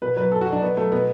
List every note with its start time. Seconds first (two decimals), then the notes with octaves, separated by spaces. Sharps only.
0.02 B2 B4
0.16 F#3 B4
0.31 B2 A4
0.41 F#4
0.47 F#3
0.52 D4
0.62 B2 B3
0.77 F#3 A3
0.92 B2 B3